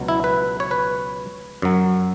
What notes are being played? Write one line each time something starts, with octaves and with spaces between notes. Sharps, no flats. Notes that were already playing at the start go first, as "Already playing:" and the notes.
Already playing: C#2 B2 F#3
E4
B4
C#5
B4
F#2 F#3